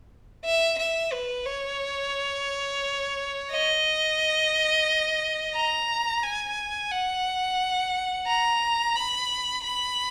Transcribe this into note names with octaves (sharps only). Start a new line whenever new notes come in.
E5
E5
B4
C#5
D#5
A#5
G#5
F#5
A#5
B5
B5